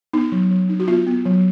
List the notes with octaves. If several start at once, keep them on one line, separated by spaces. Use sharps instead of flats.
B3 D#4
F#3
F#3
D#4
F#4
B3 F4
B3
F#3